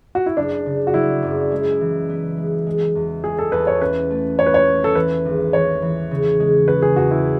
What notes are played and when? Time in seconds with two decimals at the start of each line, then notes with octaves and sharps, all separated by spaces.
0.15 F#4
0.26 E4
0.37 F#1 D4
0.66 C#3
0.87 F#4
0.94 F#3 E4
1.23 F#1
1.52 G#3
1.81 E3
2.09 B3
2.38 G#3
2.67 G#3
2.95 E2
3.24 G#3 G#4
3.39 A4
3.52 E2 B4
3.67 C#5
3.81 C#4 B4
4.11 A3
4.39 C#4 C#5
4.46 B4
4.54 C#5
4.67 A3
4.84 A4
4.95 E3 B4
5.25 G#1
5.53 E3 C#5
5.82 E3
6.11 C#3
6.40 G#3
6.67 C#3 B4
6.82 G#4
6.96 E2 F#4
7.11 E4